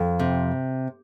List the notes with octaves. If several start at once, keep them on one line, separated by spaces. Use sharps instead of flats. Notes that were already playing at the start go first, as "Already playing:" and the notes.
Already playing: F2
C3